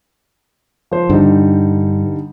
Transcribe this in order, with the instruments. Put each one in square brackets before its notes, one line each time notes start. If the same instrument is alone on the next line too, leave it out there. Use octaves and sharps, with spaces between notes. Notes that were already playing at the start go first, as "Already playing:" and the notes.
[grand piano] F3 C5
[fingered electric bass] G2 [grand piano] D3 G3 D#4